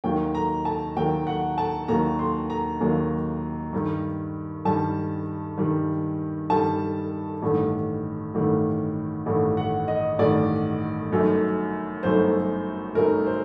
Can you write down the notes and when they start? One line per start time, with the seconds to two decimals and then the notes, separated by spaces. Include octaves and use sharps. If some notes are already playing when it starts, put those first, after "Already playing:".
0.04 D#2 D#3 F#3 A#3 G5
0.35 A#5
0.65 A5
0.96 D#2 D#3 F#3 A#3 G5
1.27 F#5
1.58 A5
1.88 D#2 D#3 F#3 A#3 A#5
2.19 C6
2.50 A#5
2.81 D#2 D#3 F#3 A#3
3.73 G2 D#3 G3
4.65 G2 D#3 G3 A5
5.58 G2 D#3 G3
6.50 G2 D#3 G3 A5
7.42 A1 G2 D#3 A3
8.34 A1 G2 D#3 A3
9.26 A1 G2 D#3 A3
9.57 F#5
9.88 D#5
10.19 A1 G2 D#3 A3 D5
11.11 G1 F#2 F#3 A3 D#4
12.03 G1 F#2 F#3 A3 D#4 C5
12.95 G1 F#2 F#3 A3 D#4 A#4
13.26 C5